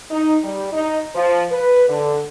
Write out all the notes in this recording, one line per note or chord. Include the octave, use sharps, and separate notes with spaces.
D#4
G3
D#4
F3
B4
D3